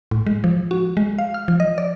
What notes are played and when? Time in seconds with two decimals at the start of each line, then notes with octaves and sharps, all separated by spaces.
0.11 A2
0.26 G#3
0.44 F3
0.71 F#4
0.97 G#3
1.19 F5
1.34 F6
1.48 F3
1.60 D#5
1.78 D5